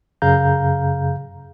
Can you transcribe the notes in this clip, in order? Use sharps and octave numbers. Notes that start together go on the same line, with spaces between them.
F#2 C#3 G#4 F5 A#5 G6